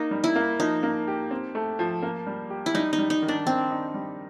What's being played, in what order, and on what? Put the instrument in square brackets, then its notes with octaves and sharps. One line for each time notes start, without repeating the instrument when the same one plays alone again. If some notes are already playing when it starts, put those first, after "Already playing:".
Already playing: [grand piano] A#3 [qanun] D#4
[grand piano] G3
[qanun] E4
[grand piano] A#3
[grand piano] F3 [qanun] D#4
[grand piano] A#3
G4
C4
A3
F3
A#3
G3
G4
[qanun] E4
[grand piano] G3 [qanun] D#4
[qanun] D#4
[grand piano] G3
[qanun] D#4
[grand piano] D#3
[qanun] D4
[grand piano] D#3 [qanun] C4
[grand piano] D#4
G3